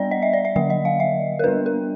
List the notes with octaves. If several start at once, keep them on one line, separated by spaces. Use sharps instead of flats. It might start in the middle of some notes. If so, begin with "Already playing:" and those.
Already playing: G3 B3 D4 D5
D#5
E5
D5
E5
D3 F#3 A#3 E5
D#5
F5
E5
A#4
G3 B3 D4 B4
A#4